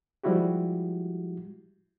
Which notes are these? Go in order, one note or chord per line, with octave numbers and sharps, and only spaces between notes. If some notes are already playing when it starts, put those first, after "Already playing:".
F3 G3 G#3 E4 F#4 G4